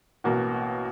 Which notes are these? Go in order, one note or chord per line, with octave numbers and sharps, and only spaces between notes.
A1 B2 A#3 F#4